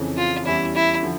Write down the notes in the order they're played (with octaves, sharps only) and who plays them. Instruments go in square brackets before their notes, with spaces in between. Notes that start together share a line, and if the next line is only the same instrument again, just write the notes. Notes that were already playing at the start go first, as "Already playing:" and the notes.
Already playing: [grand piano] F2 C#3 E3
[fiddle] F4
[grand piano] E2 E3 G3 C#4 [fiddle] E4
[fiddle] E4
[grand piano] D3 F3